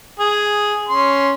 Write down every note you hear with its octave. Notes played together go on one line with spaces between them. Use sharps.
G#4
C#4 C6